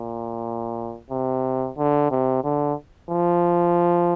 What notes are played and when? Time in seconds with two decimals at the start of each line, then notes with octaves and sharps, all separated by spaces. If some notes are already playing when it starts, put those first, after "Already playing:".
Already playing: A#2
1.10 C3
1.78 D3
2.11 C3
2.44 D3
3.11 F3